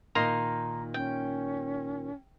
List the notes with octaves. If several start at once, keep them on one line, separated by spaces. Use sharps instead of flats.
A#2 D#3 A#3 D#4 A#5 C6
C#4 G5